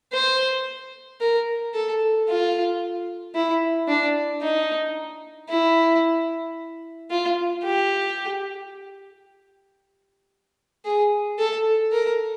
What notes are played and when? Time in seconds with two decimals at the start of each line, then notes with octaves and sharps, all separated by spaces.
0.13 C5
1.21 A#4
1.74 A4
2.29 F4
3.35 E4
3.88 D4
4.42 D#4
5.49 E4
7.11 F4
7.63 G4
10.85 G#4
11.38 A4
11.92 A#4